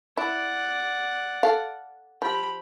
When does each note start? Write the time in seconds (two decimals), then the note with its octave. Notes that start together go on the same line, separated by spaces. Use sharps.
0.17 E4 D5 F#5
1.43 A4 F5
2.22 F3 G4 B5